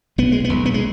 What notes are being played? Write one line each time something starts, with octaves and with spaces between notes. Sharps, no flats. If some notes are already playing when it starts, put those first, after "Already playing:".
B1 B3
G#3
B3
B1
B3
G#3